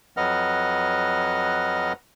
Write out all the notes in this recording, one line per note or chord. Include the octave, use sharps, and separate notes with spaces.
F2 F#3 B4 D#5 F#5 F6